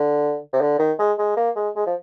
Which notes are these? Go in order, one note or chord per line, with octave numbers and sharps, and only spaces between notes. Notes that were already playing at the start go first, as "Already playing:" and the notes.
Already playing: D3
C3
D3
D#3
G#3
G#3
A#3
G#3
G#3
F3